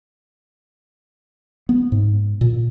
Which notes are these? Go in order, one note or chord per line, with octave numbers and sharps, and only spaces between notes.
B3
G#2
A#2